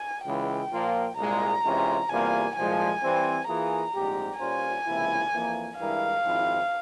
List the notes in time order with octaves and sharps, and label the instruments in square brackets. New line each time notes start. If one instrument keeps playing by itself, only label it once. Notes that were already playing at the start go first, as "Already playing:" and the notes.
Already playing: [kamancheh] G#5
[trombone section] C#2 C#3 E3 G#3 E4 [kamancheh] G5
[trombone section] A#2 F3 A#3 F4
[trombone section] C2 A#2 G#3 [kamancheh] A#5
[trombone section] C3 E3 G#3 C#4 F4
[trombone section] E2 C3 G3 A#3 F4 [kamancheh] G#5
[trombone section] C2 A#2 F3 G#3 [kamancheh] G#5
[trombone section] E3 G3 C4
[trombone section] E3 A#3 F4 G#4 [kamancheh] A#5
[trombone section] A#1 G#2 G3 C4 G4
[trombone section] A#2 G3 C#4 F4 C5 [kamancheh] G#5
[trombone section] C#2 C3 E3 A#3 E4
F2 E3 A#3
[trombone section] G2 E3 G#3 E4 A#4 [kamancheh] F5
[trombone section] G#1 G#2 F3 C4 E4